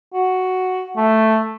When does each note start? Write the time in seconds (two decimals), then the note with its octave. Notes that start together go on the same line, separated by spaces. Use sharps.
0.14 F#4
0.97 A3